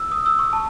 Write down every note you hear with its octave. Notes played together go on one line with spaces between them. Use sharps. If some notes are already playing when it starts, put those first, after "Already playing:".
Already playing: E6
D#6
E6
C#6
A5